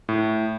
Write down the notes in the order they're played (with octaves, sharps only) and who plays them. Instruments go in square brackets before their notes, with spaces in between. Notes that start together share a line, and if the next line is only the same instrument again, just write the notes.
[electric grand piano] A2